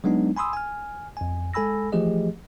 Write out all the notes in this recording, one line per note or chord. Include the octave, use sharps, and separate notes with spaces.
F#3 G#3 B3 D4 D#4
G#5 B5 C6 D#6 E6
G#5 F6
F2 G#5
G#3 A4 G#5 B5 E6 A#6
E3 F3 A3 G4 G#4 D#5